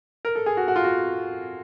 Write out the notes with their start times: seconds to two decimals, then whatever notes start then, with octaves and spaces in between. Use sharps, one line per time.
0.25 A#4
0.35 A4
0.46 G#4
0.57 F#4
0.68 F#4
0.76 F4
0.84 F#4